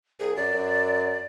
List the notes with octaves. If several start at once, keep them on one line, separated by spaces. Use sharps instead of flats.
C2 G#4
F#2 D5
F#2